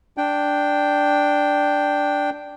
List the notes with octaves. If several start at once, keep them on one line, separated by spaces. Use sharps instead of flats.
D4 G5